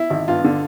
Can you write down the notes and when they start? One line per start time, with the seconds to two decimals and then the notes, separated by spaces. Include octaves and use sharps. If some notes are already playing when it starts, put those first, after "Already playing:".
Already playing: E4
0.10 G#1
0.28 G2 F4
0.44 D3